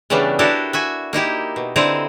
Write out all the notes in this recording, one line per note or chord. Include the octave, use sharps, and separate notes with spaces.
C#3 E3 G3 A3 B3 D4
D4 E4 F#4 G4 A4 A#4
F#4 E5 G#5
A#3 D#4 E4 G4
B2
D3 C4 D#4 E4 C5 A#5